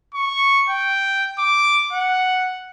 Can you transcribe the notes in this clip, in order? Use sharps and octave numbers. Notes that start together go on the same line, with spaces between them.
C#6
G5
D6
F#5